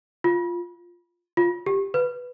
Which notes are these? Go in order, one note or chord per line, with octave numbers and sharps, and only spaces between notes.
F4
F4
G4
B4